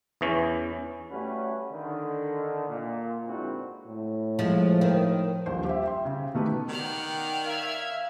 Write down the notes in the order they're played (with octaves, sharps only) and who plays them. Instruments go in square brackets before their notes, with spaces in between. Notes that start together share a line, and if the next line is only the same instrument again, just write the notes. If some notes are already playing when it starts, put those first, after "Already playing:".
[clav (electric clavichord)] E2 E3 C#4
[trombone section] G3 A3 C#4 F#4 G4 B4
D3 D#3
A#2
G#2 D3 C4 E4 F#4
[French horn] A2
[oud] F3 G#3
D#3
[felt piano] D#1 A#1 C5
G4 E5
E5 G5 C6
C#3
B2 D#3 A3 G4 B4
[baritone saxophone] D#3 [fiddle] D5 F6 [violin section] F#5 G5
[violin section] E5 E6 G#6 [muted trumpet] F5